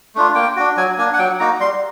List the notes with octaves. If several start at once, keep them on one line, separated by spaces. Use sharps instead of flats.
A3 D4 F4
A#3 G5
D4 F#4
F#3 G#5
A#3 D4 G#5
F#5
F#3 G5
A#3 D#4 F#4 A#5
G3 C6